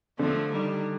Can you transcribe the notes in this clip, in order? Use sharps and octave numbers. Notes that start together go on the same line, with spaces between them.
D3 F3 A3
D#3 G3